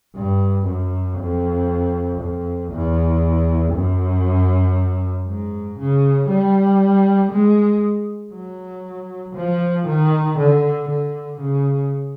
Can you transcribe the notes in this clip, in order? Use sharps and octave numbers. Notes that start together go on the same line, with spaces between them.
G2
F#2
F2
F2
E2
F#2
G#2
C#3
G3
G#3
F#3
F3
D#3
D3
D3
C#3